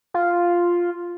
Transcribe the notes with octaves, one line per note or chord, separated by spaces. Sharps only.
F4